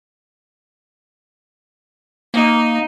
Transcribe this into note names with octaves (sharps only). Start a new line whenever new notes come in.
A#3 D#4